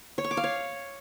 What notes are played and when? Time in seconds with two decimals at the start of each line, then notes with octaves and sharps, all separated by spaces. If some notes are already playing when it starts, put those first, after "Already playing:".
0.18 C#5
0.24 C#6
0.31 D6
0.37 F5
0.44 C#5